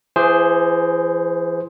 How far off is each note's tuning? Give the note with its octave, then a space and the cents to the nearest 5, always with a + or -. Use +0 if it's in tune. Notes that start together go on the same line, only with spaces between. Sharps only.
E3 +35 G#4 +0 C5 +0